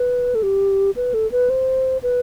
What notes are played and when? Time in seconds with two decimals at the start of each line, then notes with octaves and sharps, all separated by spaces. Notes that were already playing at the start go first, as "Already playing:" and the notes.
Already playing: B4
0.35 A4
0.43 G4
0.96 B4
1.14 A4
1.32 B4
1.50 C5
2.03 B4